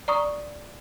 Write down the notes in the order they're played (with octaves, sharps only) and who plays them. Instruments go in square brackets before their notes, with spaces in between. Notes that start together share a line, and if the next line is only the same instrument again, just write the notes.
[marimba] D5 A#5 C#6 D#6